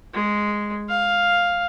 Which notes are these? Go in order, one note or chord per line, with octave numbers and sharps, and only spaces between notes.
G#3
F5